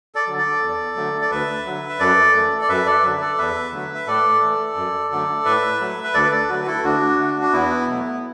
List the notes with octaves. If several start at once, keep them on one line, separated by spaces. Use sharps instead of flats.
A4 D5
D3 F#3
A4 D5
E2
D3 F#3 A3
D5
D2 B4 E5
D3 F#3
E5
F#2 A4 D5
E3 A3
D5
F#2 B4 E5
A4 D5
D3 F#3 B4 E5
A4 D5
E2 B4 E5
D3 F#3 A3
E5
A2 A4 D5
E3 A3
F#2
D3 F#3 A3
A2 B4 E5
F#3 A3
B4
D2 A4 D5
B4
A4 D5
D3 F#3 A3 F#4 B4
E4 A4
D2 D4 F#4
D3 A3
D4
E2 B3 E4
B2 F#3 A3